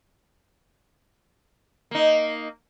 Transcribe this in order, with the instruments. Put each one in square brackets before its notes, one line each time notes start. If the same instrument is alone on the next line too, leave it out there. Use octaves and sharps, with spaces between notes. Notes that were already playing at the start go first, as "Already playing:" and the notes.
[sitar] A#3 D#4